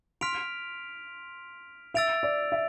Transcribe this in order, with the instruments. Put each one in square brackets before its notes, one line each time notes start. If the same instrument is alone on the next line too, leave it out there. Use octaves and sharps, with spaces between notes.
[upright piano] C6 [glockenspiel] F6 B6 D7 F7
[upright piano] E5 [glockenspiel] E6 A6 D7 F7
[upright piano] D5
E5